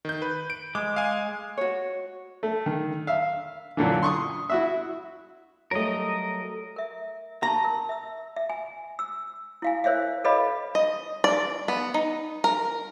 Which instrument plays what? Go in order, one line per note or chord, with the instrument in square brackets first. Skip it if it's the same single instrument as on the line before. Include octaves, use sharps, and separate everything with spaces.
[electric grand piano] D#3 G6
B4
D7
[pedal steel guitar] G#3 [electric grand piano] D6
[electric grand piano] F5 G#5
[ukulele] F#4 C#5
[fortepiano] A3
D#3
E5 F5
F#2 A#2 D3 E3
C6 C#6 D#6
E4 F#4 E5
[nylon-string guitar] F#3 G3 A3 [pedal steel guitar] A#4 D#5
[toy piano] A#4 E5
[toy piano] A5 C6 C#6 [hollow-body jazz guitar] A#5
[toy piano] A#4
E5 E6
E5
G#5
E6
E4 F5 G#5
A#4 C5 C#5 E5 F5
A4 B4 C#5 D#5 F5 B5
[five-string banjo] D#5
D5
B3
D#4
A#4